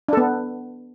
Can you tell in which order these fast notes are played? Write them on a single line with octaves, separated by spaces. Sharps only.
D4 A4 B3